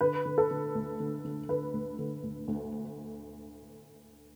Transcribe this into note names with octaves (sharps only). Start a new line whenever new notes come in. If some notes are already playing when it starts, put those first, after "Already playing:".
D3 B4
D3
A4
D3
D2
D3
D3
D3 B4
D2
D3
D2
D2